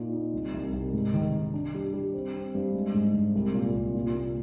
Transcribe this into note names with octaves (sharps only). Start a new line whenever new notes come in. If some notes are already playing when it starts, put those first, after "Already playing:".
Already playing: A#2 D#4
D#4
C2
C2
C2
G#2
D#3
D#3
D4
G3
G3
C4
C4
G2
G#3
G#2
G#2
C2
A#2
C2
A#2
A#2